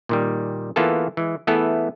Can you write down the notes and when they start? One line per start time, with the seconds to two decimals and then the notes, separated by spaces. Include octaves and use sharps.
0.09 A#2 D#3 G3
0.76 E3 A#3 B3 F4 G#4 A4
1.17 E3 G#3
1.47 E3 A3 B3 E4 G#4 A4